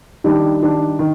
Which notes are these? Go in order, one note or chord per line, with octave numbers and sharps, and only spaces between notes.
D#3 G3 D4
D#3 G3 D4
D#3